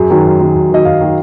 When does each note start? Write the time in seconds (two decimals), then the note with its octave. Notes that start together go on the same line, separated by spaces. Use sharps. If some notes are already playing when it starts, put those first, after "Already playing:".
Already playing: F#2 G#4
0.10 D#3 F#3
0.25 F#2
0.40 D#3 F#3
0.55 F#2
0.70 D#3 F#3 D#5
0.85 F#2 F5
1.01 D#3 F#3